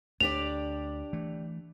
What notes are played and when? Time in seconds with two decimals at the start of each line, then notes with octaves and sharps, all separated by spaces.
0.20 D2 D4 G4 D5 F7
1.13 E3 A3